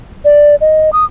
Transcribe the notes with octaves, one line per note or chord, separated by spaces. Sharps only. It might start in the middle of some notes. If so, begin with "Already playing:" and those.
D5
D#5
D#6